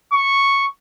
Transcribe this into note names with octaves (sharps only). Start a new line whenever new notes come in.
C#6